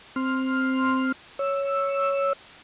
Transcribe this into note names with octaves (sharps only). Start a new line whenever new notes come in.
C4 C6 F6
C#5 E6